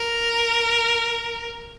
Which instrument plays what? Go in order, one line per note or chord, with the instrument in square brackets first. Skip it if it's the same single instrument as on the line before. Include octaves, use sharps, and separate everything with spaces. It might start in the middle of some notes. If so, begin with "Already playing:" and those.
Already playing: [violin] A#4